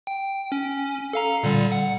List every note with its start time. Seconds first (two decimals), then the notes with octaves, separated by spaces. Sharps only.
0.07 G5
0.52 C#4
1.13 A4 F5 A#5
1.43 A#2 D3 G3
1.72 F#5